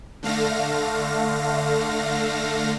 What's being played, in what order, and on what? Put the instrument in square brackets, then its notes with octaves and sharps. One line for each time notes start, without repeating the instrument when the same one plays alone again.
[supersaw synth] D3 A3 F5 A#6